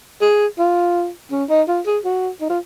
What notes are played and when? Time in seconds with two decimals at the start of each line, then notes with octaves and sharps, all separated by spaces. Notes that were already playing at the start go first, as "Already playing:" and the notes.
0.22 G#4
0.58 F4
1.31 C#4
1.50 D#4
1.68 F4
1.86 G#4
2.05 F#4
2.41 D#4
2.50 F4